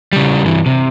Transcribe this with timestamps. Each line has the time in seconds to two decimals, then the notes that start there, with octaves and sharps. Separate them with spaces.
0.13 C#3 G3
0.44 G2 E3
0.66 C3